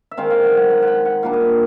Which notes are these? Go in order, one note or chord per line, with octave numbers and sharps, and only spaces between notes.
E5
D#3 G#3 C4 D#4 F5
F5
F#5
F#5
F#5
F#5
G5
F#5
A#2 G3 A#3 D4 F5
D#5
E5